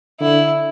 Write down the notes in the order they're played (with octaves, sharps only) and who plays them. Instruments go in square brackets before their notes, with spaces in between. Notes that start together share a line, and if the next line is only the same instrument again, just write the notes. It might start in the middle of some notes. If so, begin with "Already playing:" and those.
[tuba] D3 [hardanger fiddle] E4